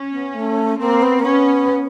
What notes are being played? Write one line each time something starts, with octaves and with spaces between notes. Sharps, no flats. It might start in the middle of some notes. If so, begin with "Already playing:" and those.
Already playing: C#4
B3
A3
A#3 C4
B3
A#3
B3 C#4